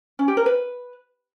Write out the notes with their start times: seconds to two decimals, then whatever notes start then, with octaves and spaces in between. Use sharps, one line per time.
0.19 C#4
0.28 G4
0.37 A#4
0.46 B4